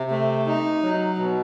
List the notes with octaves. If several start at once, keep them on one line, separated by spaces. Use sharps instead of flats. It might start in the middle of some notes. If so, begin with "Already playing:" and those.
Already playing: C3
A3
D#4
F#3
B2